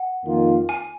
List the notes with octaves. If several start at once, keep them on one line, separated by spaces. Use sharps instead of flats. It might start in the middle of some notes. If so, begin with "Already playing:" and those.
Already playing: F#5
F2 D#3 A#3 F4
G#5